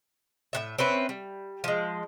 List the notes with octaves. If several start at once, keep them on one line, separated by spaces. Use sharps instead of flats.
A2 E3 E5
C4 C#4 B4 E5
G3
F3 G#3